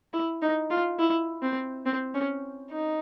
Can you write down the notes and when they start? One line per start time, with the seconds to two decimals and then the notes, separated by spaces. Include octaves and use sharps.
0.13 E4
0.42 D#4
0.70 F4
0.99 E4
1.42 C4
1.86 C4
2.14 C#4
2.71 D#4